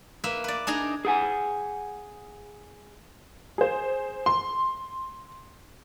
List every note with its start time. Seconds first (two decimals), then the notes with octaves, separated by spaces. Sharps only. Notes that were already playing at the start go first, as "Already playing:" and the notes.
0.24 A#3 B4 E5
0.44 B4 D5
0.67 D4 D#4 G#4 A#5
1.05 G#4 F#5 G#5
3.58 G#4 C5
4.26 C6